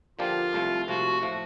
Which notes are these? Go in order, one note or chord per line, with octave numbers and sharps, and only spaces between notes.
D3 F3 A#3 D4 F4 G4
C2 C3 F3 A3
C2 C3 F3 A3 F#4
A2 F3 A3